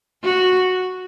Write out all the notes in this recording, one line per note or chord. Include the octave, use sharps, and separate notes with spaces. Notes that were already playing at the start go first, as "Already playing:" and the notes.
F#4